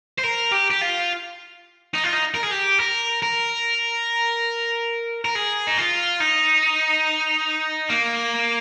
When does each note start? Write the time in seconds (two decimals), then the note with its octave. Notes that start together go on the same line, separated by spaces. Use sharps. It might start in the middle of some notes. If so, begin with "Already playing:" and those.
0.19 C5
0.24 A#4
0.52 G4
0.71 G4
0.82 F4
1.94 D#4
2.04 F4
2.13 D#4
2.35 A#4
2.43 G#4
2.51 G4
2.80 A#4
3.23 A#4
5.24 A#4
5.35 G#4
5.67 D#4
5.77 F4
6.20 D#4
7.90 A#3